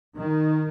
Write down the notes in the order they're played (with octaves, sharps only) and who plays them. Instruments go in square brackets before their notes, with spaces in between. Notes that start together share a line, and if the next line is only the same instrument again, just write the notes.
[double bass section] D#3